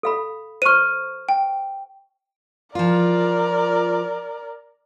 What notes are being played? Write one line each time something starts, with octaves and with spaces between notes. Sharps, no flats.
A4 F5 B5
C5 C#6 F6 D#7
G5
F3 F4 A#4 D5